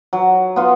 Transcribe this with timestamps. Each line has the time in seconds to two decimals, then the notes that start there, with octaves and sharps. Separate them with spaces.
0.13 F#3
0.56 B3 F4